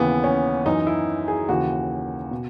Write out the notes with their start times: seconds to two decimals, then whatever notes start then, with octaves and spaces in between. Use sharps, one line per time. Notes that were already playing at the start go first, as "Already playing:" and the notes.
Already playing: D#2 C#3 E3 B3
0.24 C#4
0.66 F#2 E3 D#4
0.87 E4
1.28 G#4
1.49 D#2 C#3 E3 F#4
2.31 B2